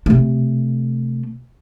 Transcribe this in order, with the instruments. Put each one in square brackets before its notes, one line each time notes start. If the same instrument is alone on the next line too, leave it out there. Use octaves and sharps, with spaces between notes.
[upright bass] C3 A3